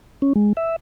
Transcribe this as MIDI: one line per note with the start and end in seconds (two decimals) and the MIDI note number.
0.22 0.33 61
0.36 0.53 56
0.57 0.76 76